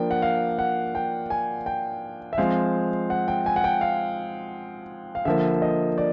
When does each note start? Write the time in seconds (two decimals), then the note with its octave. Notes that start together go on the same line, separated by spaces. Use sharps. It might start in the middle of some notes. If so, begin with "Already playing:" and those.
Already playing: F3 A#3 D4 G5
0.11 F#5
0.22 F5
0.59 F#5
0.95 G5
1.30 G#5
1.66 G5
2.33 E5
2.38 F3 G#3 C4 F5
3.10 F#5
3.28 G5
3.46 G#5
3.56 F#5
3.64 G5
3.81 F5
5.15 F5
5.25 D3 F3 A#3 E5
5.62 D#5
5.98 D5